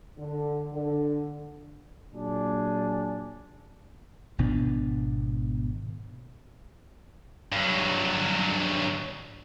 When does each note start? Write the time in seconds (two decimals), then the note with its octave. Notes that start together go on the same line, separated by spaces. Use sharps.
0.18 D3
0.73 D3
2.13 A#2 F#3 D4 G#4
4.38 G#1 B2 B3 D4
7.52 G2 F#3